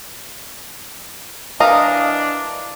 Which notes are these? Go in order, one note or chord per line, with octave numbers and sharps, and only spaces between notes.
E3 D4 A#4 D#5 F5